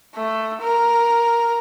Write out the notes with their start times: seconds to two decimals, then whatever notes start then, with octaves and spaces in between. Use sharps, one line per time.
0.15 A3
0.61 A#4